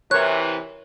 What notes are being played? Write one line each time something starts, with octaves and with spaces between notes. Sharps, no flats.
C3 E3 A#4 C#5 F#6